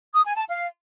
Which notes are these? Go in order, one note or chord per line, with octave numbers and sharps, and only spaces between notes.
D#6
G#5
A5
F5